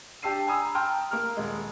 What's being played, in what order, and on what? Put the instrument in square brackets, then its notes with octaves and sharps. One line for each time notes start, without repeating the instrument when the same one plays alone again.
[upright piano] D4 G4 A5 E6 C7 D#7
G#5 A#5 B5 D#6 E6
G5 A5 A#5 C6 F6
A#3 A#5 F6
D#1 G#3